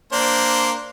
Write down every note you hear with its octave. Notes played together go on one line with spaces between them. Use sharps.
A#3 D4 C5